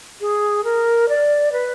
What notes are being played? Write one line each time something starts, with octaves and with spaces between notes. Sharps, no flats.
G#4
A#4
D5
B4